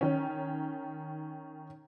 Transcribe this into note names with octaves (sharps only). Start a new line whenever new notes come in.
D#3 C#4